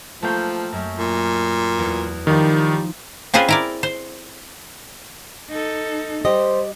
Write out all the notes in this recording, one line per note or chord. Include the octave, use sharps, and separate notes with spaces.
F3 A3 A#3 G5
F#2
A#2
E2 C#7
D#3 F3 G3 D#4
C4 C#4 F4 G#4 B4 C5
E4 A#4 D5
C5
D#4 A4
G3 G4 C5 D#5